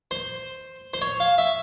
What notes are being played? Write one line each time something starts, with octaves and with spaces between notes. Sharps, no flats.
C5
C5
C#5
F5
E5